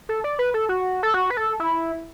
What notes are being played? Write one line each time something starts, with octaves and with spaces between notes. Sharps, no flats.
A4
D5
B4
A4
F#4
A4
F#4
B4
A4
E4